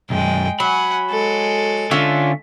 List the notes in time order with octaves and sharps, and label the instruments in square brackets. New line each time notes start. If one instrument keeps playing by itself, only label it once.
[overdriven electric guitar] B1 F#2 [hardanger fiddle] G#3 G5
[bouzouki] F#3 [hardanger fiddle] F#5 G#5 [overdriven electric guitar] B5
[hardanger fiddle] G#3 A4
[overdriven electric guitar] D3 [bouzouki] C#4 F4 E5